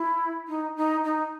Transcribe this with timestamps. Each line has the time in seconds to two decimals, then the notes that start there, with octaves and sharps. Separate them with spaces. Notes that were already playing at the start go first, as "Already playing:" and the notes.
Already playing: E4
0.48 D#4
0.76 D#4
1.04 D#4